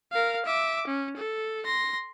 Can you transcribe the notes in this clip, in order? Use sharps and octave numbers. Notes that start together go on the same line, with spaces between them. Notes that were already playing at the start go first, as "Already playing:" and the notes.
A#4 F5
E5 D6
C#4
A4
C6 A#6